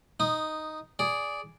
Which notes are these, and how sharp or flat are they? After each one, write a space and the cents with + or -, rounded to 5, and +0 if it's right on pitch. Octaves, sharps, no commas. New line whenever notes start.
D#4 +0 D#6 -15
G#4 +0 D5 -10